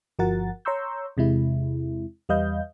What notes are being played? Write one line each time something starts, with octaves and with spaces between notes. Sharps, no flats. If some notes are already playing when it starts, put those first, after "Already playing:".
G1 F3 F#4 A#4 F#5 A6
C#5 A#5 C6 C#6 E6 G6
E2 C3 G#3 E4
E2 G3 B4 D#5 F5 G6